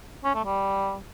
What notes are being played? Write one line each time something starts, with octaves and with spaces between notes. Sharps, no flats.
C#4
A3
G3